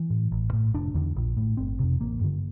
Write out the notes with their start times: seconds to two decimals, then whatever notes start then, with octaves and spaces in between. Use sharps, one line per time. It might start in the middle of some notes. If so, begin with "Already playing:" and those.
Already playing: E3
0.10 A2
0.32 A1
0.53 A2
0.74 F1 D4
0.94 E2 D3
1.16 A#1
1.37 A2
1.57 G1 C4
1.79 F2 C3
2.00 A1 A#3
2.21 G2 D3